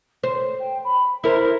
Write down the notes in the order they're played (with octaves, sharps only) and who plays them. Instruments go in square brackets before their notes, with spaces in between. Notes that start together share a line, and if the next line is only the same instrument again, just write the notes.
[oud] C5 [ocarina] C#5
[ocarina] G5
B5
[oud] E4 A#4 C5